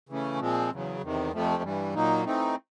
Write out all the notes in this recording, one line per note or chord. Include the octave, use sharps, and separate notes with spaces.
C#3 E3 A3 C#4
A#2 F3 G#3 C4
E2 C#3 F#3
E2 C3 D#3
F2 C3 F3 A3
G2 E3 G3
A#2 F#3 A#3 D#4
E3 A3 C4 D#4